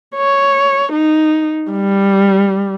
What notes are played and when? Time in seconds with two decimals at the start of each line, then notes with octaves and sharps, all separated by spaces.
0.16 C#5
0.92 D#4
1.72 G3